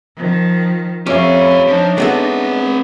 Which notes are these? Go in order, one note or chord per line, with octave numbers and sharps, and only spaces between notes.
D#3 F3
F2 C#4 G4 C#5 E5 F5
F3 D4 D#4
G#3 B3 C4 A4 F#5